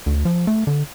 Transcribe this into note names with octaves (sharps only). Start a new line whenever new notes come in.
D2
F3
A3
D3